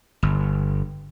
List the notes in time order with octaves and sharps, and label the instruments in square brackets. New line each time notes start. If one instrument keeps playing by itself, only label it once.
[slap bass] G1